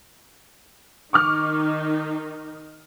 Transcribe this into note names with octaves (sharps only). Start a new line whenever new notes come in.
D#3 D#4 C#6 D6 F6